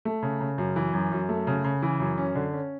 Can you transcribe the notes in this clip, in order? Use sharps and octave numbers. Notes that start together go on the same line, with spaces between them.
A3
C#3
C#3
F#2
E3
F#2
F#2
A3
C#3
C#3
E3
F#2
C#4
D3
C#4